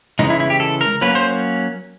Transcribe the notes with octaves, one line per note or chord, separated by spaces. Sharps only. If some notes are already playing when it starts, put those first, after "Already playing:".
C#3 E3 G#3 D#4
E4
E4
G4
A4
A#4
F#3 A#3 C#4 B4
C5